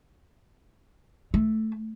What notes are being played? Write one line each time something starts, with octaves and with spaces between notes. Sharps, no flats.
A3